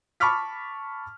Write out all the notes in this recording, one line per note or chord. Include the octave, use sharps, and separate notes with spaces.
A5 B5 C#6 D6 F6 B6